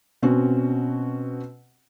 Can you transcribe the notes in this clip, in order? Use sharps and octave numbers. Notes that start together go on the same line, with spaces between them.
B2 C4 C#4 F#4